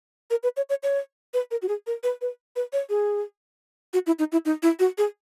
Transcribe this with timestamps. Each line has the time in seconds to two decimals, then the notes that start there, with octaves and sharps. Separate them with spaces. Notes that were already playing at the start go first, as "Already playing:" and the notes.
0.30 A#4
0.43 B4
0.57 C#5
0.70 C#5
0.83 C#5
1.34 B4
1.51 A#4
1.62 F#4
1.69 G#4
1.87 A#4
2.03 B4
2.21 B4
2.56 B4
2.73 C#5
2.90 G#4
3.93 F#4
4.07 E4
4.19 D#4
4.32 E4
4.45 D#4
4.63 E4
4.79 F#4
4.98 G#4